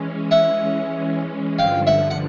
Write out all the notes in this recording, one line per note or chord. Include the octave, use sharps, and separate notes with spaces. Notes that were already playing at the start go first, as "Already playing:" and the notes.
Already playing: E3 G#3 C#4
E5 F#5
G2 D3 F3 F5 G5
E5 F#5
F#5